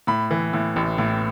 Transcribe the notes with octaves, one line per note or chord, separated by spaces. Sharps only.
A2 B5
E3
A2
A1
A2